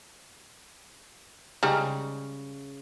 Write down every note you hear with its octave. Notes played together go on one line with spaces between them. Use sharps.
C#3 G3 G#3 D#4